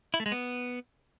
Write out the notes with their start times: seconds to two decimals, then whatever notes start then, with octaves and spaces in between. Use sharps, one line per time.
0.14 E4
0.20 A3
0.26 G#3
0.32 B3